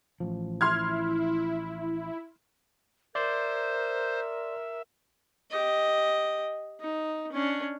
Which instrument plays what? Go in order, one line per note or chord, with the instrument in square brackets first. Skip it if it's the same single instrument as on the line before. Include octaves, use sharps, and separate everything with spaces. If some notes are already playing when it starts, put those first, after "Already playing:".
[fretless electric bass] A1 F3
[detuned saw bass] E4 [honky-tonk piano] C6 F6 G#6
[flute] A#4 [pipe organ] C5 [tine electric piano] D5 C6 [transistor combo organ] E5
[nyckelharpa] G4 D#5
D#4
C#4 D4